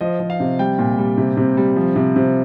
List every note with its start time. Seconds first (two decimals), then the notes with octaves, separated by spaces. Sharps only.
0.01 F3 D#5
0.20 F3
0.30 F5
0.40 C3
0.59 G3 G5
0.79 A#2
0.98 G3
1.18 C3
1.37 C3
1.57 G3
1.76 F3
1.96 C3
2.16 C3